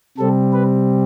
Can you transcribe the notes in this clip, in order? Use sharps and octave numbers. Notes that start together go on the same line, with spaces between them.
C3 G3 C4 A4
B4